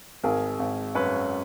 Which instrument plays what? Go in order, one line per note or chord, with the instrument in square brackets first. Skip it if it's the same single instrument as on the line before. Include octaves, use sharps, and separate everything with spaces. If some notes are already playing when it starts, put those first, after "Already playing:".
[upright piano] G#1 G#4 A#4
G#1
F#2 B4 C#5